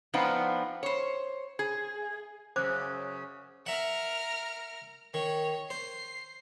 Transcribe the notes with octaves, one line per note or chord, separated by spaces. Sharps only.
F3 B3 C4 D4 D#4 F4
C5 C#5
G#4
F#2 C#3 C5 D6
A#4 E5 F#5 F6
D#3 C#5
C5 C7